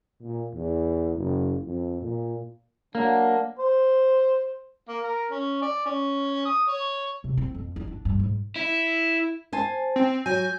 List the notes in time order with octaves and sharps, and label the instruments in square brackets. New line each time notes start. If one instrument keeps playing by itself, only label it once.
[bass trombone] A#2
E2
F#1
F2
A#2
[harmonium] F#3 D4 [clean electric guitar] A#3
[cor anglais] C5
[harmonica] A#3
A#4
C#4
D5
C#4
D#6
C#5
[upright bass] C3
C4
F2
D#4
D4
G2
G#2
[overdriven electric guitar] E4
[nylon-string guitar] C5 G#5 A5
[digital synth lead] C4
[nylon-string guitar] F#3 [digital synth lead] G#5 [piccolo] G6